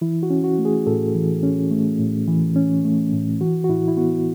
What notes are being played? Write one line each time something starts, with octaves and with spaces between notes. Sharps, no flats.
E3 E4
F#4
C#4
F#4
A3
G#4
A2 A4
E3
C#4
A3
A2
E3
C#4
A3
A2
E3 F#4
F#4
A2 E4
E4
B3 F#4